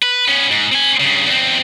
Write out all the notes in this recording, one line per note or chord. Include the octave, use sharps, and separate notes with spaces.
B4
B3 C#4
G#2
C4 G#5
G2 C#3
E2 C4